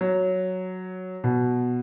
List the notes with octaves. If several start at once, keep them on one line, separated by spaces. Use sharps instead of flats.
F#3
B2